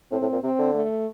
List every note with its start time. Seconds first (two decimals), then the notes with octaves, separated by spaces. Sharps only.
0.11 A2 C4
0.22 A2
0.32 A#2
0.43 C3 C4
0.59 D3
0.74 A3